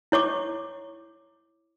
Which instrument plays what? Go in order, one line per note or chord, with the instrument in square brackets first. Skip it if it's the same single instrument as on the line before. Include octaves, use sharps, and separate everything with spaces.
[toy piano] E4 C#5 C#6 D6